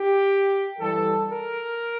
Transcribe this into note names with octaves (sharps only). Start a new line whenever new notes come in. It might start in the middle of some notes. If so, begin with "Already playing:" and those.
Already playing: G4
G2 E3 G3 A4
A#4